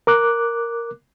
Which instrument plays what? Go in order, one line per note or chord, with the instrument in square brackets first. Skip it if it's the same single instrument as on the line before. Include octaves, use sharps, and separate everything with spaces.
[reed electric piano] A#4 D6 F#6